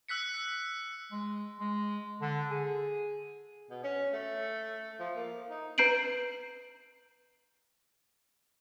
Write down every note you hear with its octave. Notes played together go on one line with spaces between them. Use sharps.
E6 F#6 B6 C#7
G#3
G#3
D3
G#4
B2
C#4
A3
F3
A#3
D#4
B4 A#5 G6 C7 D7 F#7